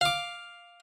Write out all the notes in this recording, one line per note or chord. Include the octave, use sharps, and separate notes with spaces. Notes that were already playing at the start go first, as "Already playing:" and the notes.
F5 D6